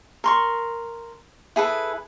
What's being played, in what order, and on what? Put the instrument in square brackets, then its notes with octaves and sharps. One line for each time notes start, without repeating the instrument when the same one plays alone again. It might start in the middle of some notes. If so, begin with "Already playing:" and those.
[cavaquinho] A#4 C6 C#6
E4 G#4 A4 B4